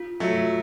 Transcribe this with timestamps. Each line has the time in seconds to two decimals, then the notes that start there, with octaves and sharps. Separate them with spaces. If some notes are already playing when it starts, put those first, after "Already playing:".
Already playing: F4
0.20 F#3 A3
0.36 F4